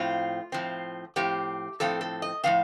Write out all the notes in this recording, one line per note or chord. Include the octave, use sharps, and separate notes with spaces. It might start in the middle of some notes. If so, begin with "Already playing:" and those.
Already playing: A2 F3 C4 F4
A2 F3 C4
A2 F3 C4 G4
A2 F3 C4 A4
A4
D#5
A2 F3 C4 F5